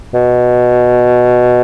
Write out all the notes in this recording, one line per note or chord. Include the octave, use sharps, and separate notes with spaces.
B2